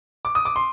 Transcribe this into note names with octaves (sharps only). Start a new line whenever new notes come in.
D6
D#6
D6
C6